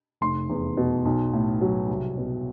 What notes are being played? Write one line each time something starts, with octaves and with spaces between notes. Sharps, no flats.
F1 C6
E2
B2
B1
A2
F#3
C2
B2